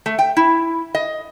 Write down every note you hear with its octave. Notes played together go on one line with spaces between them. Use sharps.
A3
G5
E4
D#5